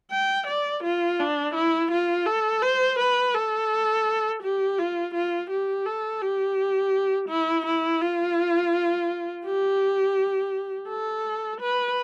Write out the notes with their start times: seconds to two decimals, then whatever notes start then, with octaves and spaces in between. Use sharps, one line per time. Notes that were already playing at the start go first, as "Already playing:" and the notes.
0.11 G5
0.47 D5
0.84 F4
1.20 D4
1.55 E4
1.91 F4
2.27 A4
2.62 C5
2.99 B4
3.34 A4
4.43 G4
4.78 F4
5.14 F4
5.50 G4
5.86 A4
6.22 G4
7.29 E4
7.66 E4
8.01 F4
9.46 G4
10.89 A4
11.61 B4